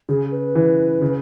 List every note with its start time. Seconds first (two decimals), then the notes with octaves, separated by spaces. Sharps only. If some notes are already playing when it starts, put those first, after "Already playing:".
0.09 C#3 G#4
0.32 B4
0.55 E3
1.02 C#3